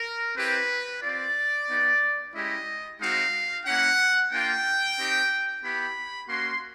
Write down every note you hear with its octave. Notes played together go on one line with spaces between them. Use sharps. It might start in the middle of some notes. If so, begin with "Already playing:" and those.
Already playing: A#4
C4 E4 G4 B4
C4 F4 D5
B3 D#4 G4
G#3 C#4 E4 G4 D#5
G#3 C4 D#4 F#4 F5
A#3 C#4 E4 F#5
A#3 D4 F4 G5
C4 D#4 G4
B3 E4 G4 B5
A#3 C#4 F#4 C6